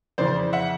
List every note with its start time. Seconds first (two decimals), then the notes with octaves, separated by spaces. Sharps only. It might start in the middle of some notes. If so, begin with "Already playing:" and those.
0.18 F2 C#3 E3 C5 D5
0.53 E5 F#5